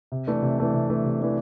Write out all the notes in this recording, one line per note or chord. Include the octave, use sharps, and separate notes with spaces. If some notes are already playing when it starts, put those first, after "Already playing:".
C3
E3 A3 D4
C3
E3 A3 D4
C3
E3 A3 D4
C3
E3 A3 D4